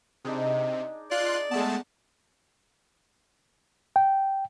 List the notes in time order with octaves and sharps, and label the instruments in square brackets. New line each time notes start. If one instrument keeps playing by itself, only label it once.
[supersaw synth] C3 [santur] D4 D#4 G#4
[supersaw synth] F4 C6 F#6 [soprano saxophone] D5
[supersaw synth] G#3 A3 A5 [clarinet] B3
[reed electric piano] G5